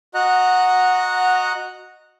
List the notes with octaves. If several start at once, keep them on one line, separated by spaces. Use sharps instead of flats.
F#4 D#5 F#5 A#5 F#6